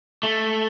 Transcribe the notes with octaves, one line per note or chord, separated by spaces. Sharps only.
A3